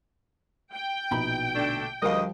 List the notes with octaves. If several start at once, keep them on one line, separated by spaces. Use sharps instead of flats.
G5
A#1 B2 D#4 B5
D3 A3 D4
D2 G#2 F3 G3 A#4 D#5 F5